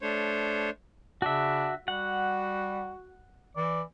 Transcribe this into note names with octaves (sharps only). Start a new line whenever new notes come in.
A3 D4 C5 C#5
C#3 D4 F#4 E5
G3 F#4 F#5
E3 D5